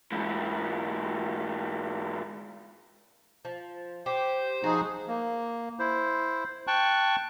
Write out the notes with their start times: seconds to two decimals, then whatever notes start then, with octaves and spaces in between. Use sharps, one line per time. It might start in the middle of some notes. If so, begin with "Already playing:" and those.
0.12 G#2 E3
3.45 F3
4.06 G4 C5
4.64 F3 D#4 F#4 G#4
5.08 A#3
5.79 E4 C5
6.67 G5 A5 C#6 F#6